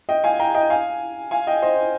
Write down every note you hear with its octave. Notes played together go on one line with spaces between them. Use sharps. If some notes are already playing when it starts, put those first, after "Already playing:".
D#5 G5
F5 G#5
G5 A#5
D#5 G5
F5 G#5
F5 G#5
D#5 G5
C5 D#5